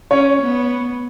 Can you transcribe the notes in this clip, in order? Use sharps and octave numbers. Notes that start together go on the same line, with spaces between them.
C#4 C#5
B3